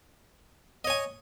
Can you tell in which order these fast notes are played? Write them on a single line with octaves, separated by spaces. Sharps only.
D#5 C#5 G#5